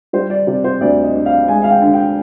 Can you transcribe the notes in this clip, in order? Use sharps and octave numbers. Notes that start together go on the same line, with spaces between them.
G3 C5
D5
C3 D5
C5
D2 D5
D#5
D4
F5
G#3 G#5
F5
G5
D3
G5